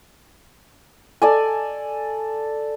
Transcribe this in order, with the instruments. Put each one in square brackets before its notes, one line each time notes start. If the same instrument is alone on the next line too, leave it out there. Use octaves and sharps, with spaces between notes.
[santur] A4 D5 G#5